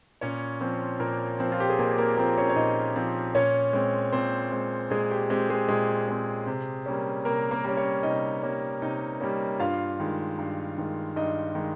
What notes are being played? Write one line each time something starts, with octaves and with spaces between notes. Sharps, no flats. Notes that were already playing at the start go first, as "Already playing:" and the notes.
A#2 C#4 C#5
F3 C4
A#2 A#3 A#4
F3 C4
F4
G4
G#4
A#2 A#3 A#4
A#3 A#4
F3 A#3 C4 A#4
C#4 C#5
C#5
A#2 D#4 D#5
F3 C4
A#2 C#4 C#5
G#3 C4
A#2 C4 C5
G#3 C4
A#2 G#3 G#4
G4
G#3 C4 G4
G#3 G#4
A#2 G#3 G#4
G#3 C4
C3
G3 A#3 C#4
C3 A#3 A#4
A#3 A#4
G3 A#3 C#4
C#4 C#5
C3 D#4 D#5
G3 A#3 C#4
C3 D#4 D#5
G3 A#3 C#4
G2 F4 F5
D#3 G#3
G2
D#3 G#3
G2 D#4 D#5
D#3 G#3